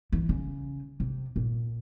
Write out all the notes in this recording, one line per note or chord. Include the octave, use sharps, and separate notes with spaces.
E3
C#3
C3
A#2